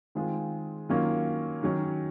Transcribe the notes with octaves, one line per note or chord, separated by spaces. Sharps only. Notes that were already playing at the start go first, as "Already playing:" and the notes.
D#3 G#3 C4 F4 G#4
D#3 F#3 A#3 C#4 F4
D#3 F#3 C#4